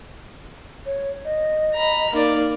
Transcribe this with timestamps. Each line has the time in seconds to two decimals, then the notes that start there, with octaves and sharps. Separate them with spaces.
0.86 C#5
1.25 D#5
1.75 A#5 B5
2.13 A#3 D#4 D5